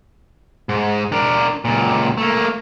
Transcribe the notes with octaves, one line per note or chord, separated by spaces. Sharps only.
G#2
D4 A#4
C#2 A#2
A3 A#3